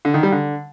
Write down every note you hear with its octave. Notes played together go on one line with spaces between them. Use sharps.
D3
D#3
G3
D3